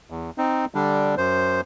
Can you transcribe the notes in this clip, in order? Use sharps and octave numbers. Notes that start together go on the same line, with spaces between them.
E2
C4 D#4
D3 G3 D4
F#2 C5